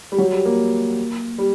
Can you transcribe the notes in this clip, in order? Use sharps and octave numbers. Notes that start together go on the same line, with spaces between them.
G3
F#3
G3
A#3
G3